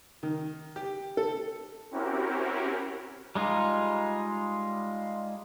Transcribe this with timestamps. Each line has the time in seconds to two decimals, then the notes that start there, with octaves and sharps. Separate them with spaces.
0.23 D#3
0.76 G4
1.17 A4
1.91 C4 C#4 E4 F#4 G4 A#4
3.35 G3 G#3 D#4 F4